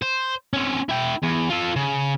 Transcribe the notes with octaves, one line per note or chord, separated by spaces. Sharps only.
C5
C4 C#4
E4 G5
E2
F4 A4
C#3